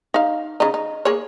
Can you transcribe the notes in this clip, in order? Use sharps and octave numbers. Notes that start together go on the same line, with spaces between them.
D#4 F5
C#3 D#4
D#4
A#3 G#4 C#5